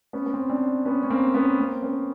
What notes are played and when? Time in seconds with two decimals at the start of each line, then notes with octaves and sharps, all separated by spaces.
0.13 B3 C#4
0.26 B3
0.34 C4
0.42 C#4
0.49 C4 D4
0.85 B3 C#4
1.03 C#4
1.10 A#3 C4
1.34 B3 C#4
1.58 A#3 C4
1.82 B3 C#4